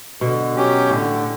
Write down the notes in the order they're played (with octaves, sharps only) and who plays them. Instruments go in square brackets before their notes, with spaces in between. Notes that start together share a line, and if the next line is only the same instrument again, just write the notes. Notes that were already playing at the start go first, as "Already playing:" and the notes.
[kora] B2 [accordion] D3
[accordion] F#3 C#4 G4
[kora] A2 [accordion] D3